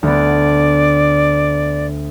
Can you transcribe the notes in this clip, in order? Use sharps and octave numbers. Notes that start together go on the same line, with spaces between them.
D2 B3 D5